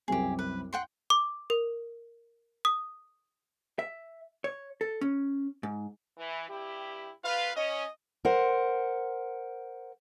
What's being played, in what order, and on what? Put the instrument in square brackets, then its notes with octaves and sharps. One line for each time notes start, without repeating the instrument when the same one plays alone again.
[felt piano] C2 F#2 C4 [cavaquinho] G4 G#4
[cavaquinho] B4
F#5 G5 C6
[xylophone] D6
A#4
D#6
[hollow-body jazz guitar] E5
C#5
A4
C#4
G#2
[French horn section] E3
G2 E4 G4
[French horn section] F2 F4 B4 [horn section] F5
[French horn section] C#4 [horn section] D#5
[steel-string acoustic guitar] A#4 C5 F#5